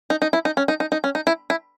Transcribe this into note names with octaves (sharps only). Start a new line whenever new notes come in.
D#4
D#4
E4
D#4
C#4
D#4
D#4
D#4
C#4
D#4
E4
E4